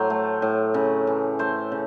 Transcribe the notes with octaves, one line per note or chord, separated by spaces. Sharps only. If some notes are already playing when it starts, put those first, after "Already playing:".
Already playing: A2 F#3 C5
A3
A2
C#3
E3
A3 C5
C#3